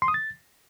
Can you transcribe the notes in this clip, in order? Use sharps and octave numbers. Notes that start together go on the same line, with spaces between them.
C6
D#6
A6